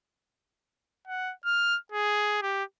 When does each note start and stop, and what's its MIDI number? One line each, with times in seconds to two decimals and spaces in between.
1.07 1.33 78
1.45 1.77 89
1.92 2.41 68
2.42 2.64 67